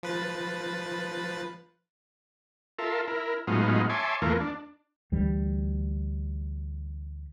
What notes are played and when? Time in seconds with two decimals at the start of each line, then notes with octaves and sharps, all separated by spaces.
0.03 F3 B4 A6
2.79 F4 A4 A#4 E5
3.08 E4 A#4
3.47 A2 F#3 G#3 B3 D#4 F4
3.90 C#5 E5 G#5 A5 C6 D6
4.22 E2 E3 A3 A#3 F4 A#4
4.40 D4
5.12 D2 E3 G3